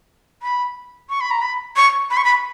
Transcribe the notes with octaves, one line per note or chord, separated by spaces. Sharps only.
B5
C#6
B5
A#5
B5
C#6
B5
C#6
B5